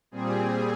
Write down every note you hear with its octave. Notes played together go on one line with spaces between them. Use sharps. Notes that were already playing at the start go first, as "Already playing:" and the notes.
A#2 G3 C4 G#4